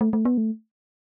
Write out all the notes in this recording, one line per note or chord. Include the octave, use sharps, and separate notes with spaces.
A3
A3
B3
A3